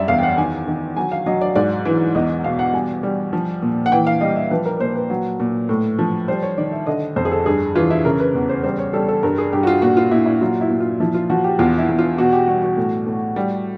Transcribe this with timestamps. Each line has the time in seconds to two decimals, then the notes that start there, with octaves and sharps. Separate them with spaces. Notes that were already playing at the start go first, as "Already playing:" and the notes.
Already playing: F#2 G3 D5 E5
0.08 E2 F5
0.18 G5
0.23 F#5
0.37 D#3 G#5
0.67 D#3
0.97 F#3 G#5
1.12 F5
1.26 F#3 D#5
1.41 D5
1.55 G#2 D5
1.85 E3
2.15 E2 D#5
2.44 B2 F5
2.59 F#5
2.73 G3 G#5
3.03 G3
3.33 F3
3.62 A#2
3.86 F#5
3.92 E3 G5
4.07 F5
4.21 G3 D#5
4.36 E5
4.51 F3 B4
4.66 A#4
4.80 A#2 C5
4.95 B4
5.10 F#3
5.40 A#2
5.69 A2
5.99 F3
6.28 G3 C5
6.43 C#5
6.58 D#3 D5
6.72 E5
6.86 D3 D#5
7.16 F2 C5
7.25 G#4
7.32 A4
7.46 G2 G#4
7.75 E3 F4
7.90 E4
8.05 C#3 A#4
8.20 B4
8.35 E2
8.49 C5
8.63 G3 C5
8.79 C#5
8.93 G3 A4
9.08 A4
9.23 G2 A#4
9.38 G#4
9.53 G2 G4
9.63 F#4
9.67 F4
9.82 A#2 F#4
9.97 F4
10.11 A#2 E4
10.26 E4
10.41 F#3 F4
10.61 E4
10.70 A#2
10.80 F4
11.00 F3 E4
11.15 F4
11.30 F3 F#4
11.44 G4
11.59 E2 F4
11.78 E4
11.89 E2
11.99 F4
12.18 B2 F#4
12.33 G4
12.48 G3 F#4
12.62 F#4
12.77 A2
13.07 A2
13.36 G3